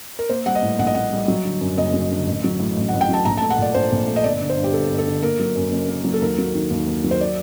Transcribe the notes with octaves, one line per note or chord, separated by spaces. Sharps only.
A#4
A#3 C5
G3 F#5
D#5
A2
A#1 F#5
D#5
A#3 F#5
G3
F#3
D3
F#2
F#1 D#5
F#3
D3
A1
F#3
A2
A1
F#5
A1
G5
F#3 A5
A#1 A#5
A5
A3
F#5
A#2 D5
A#1 C5
A#1
A3
D#5
G1 D5
D3
C5
G2
G4
G1 A4
G1
A4
D3
A#3 A#4
F#3
F#2
F#1
A#3
F#3
A4
D#2 A#4
F#3
D#3
D#2
D#2
F#3
C5
D5